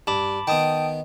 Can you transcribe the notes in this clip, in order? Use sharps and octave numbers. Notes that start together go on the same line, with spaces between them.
G2 A5 B5 D6
D#3 B3 G5 A5 D#6